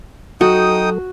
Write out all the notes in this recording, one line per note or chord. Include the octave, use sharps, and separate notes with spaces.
F#3 D#4 F#4 A4 G5 D#6